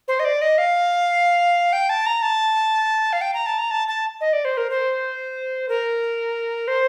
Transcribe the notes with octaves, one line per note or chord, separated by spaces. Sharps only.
C5
D#5
D5
D#5
F5
G5
A5
A#5
A5
F5
G5
A#5
A5
A#5
A5
A5
D#5
D5
C5
A#4
C5
A#4
C5